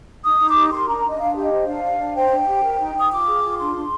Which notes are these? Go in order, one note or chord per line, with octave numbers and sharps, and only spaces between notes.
D#4 D#6
D#4
D6
G4
A#4 C6
D4 A#5
D4 D#5
D4 F5
G4 F5
D#5
C5
D4 F5
D4
D4
C5 G5
D4
G4
A#4
D#4
D#4 D#6
F4 D6
G#4
F4
D4 C6
D4